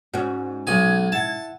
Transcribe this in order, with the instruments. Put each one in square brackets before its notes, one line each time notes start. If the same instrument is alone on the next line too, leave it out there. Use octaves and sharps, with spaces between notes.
[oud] G#2 C#4 [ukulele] F#4
[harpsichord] B1 G#5 [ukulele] D#4 [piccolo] G#6
[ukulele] E4 F#5 [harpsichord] A5